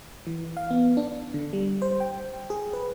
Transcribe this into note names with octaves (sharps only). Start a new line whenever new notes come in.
E3
F5
B3
D4
D3
G3
C5
G5
G#4
B4